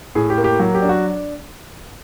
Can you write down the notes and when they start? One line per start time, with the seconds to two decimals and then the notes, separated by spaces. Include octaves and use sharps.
0.15 A2 G#4
0.30 G4
0.37 A#3
0.44 G4
0.60 F#3
0.75 G4
0.82 D4
0.89 F#4